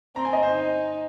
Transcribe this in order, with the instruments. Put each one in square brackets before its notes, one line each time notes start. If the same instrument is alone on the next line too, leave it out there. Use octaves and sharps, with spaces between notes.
[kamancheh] C4 [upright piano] A#5
[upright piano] G#5
D#5
C5
[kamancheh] D#4